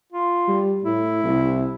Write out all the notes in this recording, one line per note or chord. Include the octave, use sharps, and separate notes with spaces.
F4
G3
A2 E4
C2